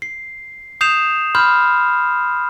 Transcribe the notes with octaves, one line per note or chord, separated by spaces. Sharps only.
C7
D#6 G6 C7 E7 F7
B5 C6 F6 G6